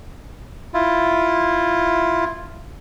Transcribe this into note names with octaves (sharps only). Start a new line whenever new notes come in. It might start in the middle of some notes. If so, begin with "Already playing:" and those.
E4 F4